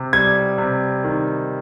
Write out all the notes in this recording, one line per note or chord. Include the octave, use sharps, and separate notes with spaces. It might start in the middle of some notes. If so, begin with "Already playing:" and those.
Already playing: C3
G3 G#6
C3
D#3